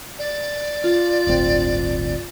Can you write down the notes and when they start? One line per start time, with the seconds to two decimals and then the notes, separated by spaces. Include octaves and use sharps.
0.18 D5
0.84 F4
1.27 D1 G1 C4